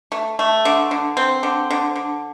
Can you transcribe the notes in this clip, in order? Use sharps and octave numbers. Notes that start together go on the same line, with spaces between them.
A3
A3
D3
D3
C4
D3
D3
D3